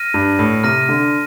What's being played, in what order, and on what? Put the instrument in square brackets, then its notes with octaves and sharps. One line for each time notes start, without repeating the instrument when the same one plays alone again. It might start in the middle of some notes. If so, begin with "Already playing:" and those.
Already playing: [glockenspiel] F6 A#6 D#7
[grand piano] G2
A2
[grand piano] C3 [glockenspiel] F6 A#6 D#7
[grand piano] D3